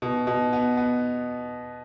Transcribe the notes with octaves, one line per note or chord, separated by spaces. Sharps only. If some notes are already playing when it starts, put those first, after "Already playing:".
B2
B2
B3
B3